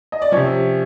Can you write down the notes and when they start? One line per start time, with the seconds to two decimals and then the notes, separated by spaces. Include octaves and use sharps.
0.12 D#5
0.22 D5
0.32 C3 F3 C#4 C#5